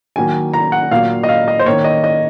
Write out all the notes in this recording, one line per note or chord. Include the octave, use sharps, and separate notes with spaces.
D#3 F#3 A#3 G#5
A#5
F#5
A#2 F#3 A#3 F5
D#5
F5
D#5
C5
D#3 A#3 C#5
D#5
D#5